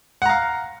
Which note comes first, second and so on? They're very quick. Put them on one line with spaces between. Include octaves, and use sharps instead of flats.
F#5 A#5 F5